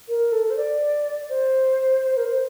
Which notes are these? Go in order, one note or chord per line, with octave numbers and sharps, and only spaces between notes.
A#4
A4
C5
D5
C5
A#4
C5